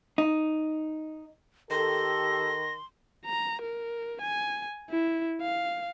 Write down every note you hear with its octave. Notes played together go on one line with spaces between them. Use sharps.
D#4
D#3 G4 A4 C6 A#6
A#5
A#4
G#5
E4
F5